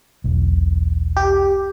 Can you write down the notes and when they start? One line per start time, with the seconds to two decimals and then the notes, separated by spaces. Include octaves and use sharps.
0.24 E1 B1
1.17 G4